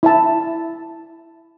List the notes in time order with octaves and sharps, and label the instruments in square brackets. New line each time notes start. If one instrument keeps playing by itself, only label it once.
[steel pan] E4 E5 A5